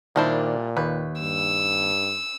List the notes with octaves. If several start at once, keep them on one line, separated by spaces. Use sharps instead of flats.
A#2 D#3 G3 D4 E4 C5
D#2 B4
G2 E6